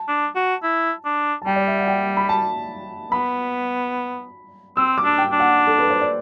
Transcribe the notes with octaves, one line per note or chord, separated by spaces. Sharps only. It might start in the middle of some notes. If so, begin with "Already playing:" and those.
Already playing: A5
D4
F#4
E4
D4
A5
G3 G5
D5
E5
F#5
G5
B5
A5
B3 B5
C4 E6
D6
D4
G5
D4
F#5
A4
B4
C5
D5